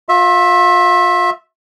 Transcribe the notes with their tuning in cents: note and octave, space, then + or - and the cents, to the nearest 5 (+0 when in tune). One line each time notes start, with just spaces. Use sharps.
F4 +35 E5 -5